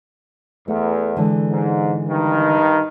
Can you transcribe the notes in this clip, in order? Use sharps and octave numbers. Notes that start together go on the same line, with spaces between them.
E2 A3
D3 E3 G#3
G#2
G2 D#3